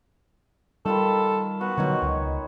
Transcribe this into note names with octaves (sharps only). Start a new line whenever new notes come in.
D#3 G3 F4 A4 B5
B3 F#4
B2 D3 F#3 D#4 C#5
C#2